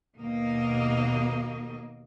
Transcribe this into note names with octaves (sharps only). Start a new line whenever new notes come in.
D#2 B2 A#3 D#5